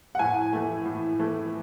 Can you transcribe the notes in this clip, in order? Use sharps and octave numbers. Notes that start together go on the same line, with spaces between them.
F#5
A2 G#5
E3 A3
A2
E3 A3